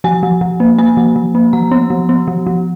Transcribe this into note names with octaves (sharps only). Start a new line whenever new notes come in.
F3 G#5
F3
F3
A#3
A#3 G#5
F3
F3
A#3
F3 A#5
B3
F3
B3
F3
F3